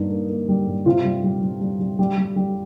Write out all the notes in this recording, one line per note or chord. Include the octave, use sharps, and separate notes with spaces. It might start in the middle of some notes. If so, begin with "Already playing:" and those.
Already playing: G2 A#3 D#4
A#3
A#3
G3
G2
C3 F4
G3
G3
G3
G3
G3
G3
G3
G3